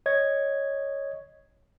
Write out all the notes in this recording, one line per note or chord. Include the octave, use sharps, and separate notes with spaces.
C#5 D#5 G#6